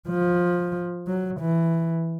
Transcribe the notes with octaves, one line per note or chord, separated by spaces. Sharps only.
F3
F#3
E3